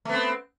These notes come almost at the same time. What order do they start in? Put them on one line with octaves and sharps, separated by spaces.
A3 B3 C4